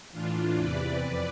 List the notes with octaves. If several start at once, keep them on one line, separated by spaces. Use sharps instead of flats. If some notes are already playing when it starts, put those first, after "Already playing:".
A2 E3 D4 F4
E2 C3 E3 B4 D5
F2